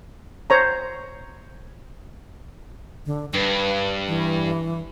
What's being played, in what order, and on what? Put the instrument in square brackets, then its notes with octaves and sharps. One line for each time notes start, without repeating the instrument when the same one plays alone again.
[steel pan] C5 C#5 A#5
[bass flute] D3
[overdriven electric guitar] G2 [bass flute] B4
[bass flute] E3